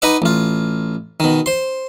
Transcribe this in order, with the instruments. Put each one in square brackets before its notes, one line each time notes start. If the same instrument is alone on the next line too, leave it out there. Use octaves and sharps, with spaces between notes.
[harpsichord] D#4 B4 D#5 F#5 D6
A1 F4
B2 D#3
C5 C6